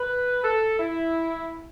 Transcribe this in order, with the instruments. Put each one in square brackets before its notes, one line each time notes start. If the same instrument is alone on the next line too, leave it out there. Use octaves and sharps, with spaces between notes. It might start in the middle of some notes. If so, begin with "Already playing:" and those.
Already playing: [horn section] B4
A4
E4